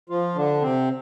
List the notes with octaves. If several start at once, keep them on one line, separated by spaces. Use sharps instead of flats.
F3 F4
D3 D4
C3 C4